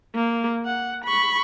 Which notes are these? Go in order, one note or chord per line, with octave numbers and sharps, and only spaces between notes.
A#3
F#5
B5 C#6